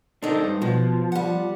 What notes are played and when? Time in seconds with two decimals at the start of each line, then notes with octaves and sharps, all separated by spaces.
0.23 D4 D#4 A4 A#4 C5
0.43 G2
0.62 B2 F3
1.12 G3 F#5